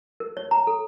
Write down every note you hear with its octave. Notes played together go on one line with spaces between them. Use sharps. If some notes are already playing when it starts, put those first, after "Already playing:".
A#4
C#5
A#5
A4